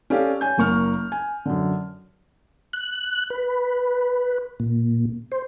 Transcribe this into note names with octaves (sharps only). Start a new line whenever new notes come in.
C#4 G4 A4 D5 F5
C#5 G#5 G6
F#1 A#3 C#6 F6
G#5
F#2 D3
F#6
B4
A#2
C5